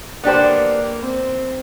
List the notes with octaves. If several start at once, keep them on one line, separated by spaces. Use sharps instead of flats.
A#3 B3 D4 G4 C5
C4